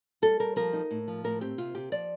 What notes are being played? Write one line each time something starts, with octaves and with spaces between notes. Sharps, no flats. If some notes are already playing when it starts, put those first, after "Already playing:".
G3 A4
G3 A#4
F3 A#4
D#4
A2
F3
A2 A#4
C4 G4
C3 F4
C3 G4
F3 D5